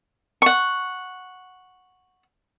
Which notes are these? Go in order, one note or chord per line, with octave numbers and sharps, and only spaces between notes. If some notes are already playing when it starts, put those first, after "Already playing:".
F#5 C#6